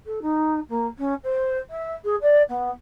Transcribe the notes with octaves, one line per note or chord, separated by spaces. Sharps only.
A4
D#4
A#3
C#4
C5
E5
G#4
D5
B3